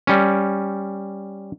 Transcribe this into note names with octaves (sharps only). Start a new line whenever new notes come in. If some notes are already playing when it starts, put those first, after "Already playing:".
G3 C#4